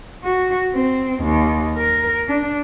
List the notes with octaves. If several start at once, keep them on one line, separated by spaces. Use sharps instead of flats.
F#4
C4
D#2
A#4
D4